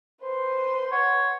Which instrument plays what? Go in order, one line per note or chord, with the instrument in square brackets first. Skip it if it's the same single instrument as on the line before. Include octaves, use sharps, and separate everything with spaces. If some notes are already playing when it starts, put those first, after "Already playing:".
[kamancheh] B4 C6 [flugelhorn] C5
[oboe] C#5 [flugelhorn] F#5